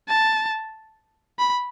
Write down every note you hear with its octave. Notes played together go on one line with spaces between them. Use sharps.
A5
B5